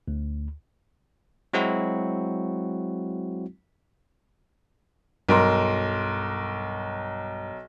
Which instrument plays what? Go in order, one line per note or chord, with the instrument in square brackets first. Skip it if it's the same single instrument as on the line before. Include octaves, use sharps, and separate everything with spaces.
[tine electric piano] D2
F#3 G#3 C4 E4 F#4
[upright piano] B1 A#4 C6 [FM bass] G2